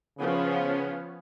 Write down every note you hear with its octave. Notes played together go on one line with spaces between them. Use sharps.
C#3 F3 B3 C#4